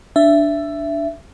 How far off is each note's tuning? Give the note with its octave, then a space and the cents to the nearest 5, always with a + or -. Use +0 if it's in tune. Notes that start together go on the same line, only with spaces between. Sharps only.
D4 +0 E5 +15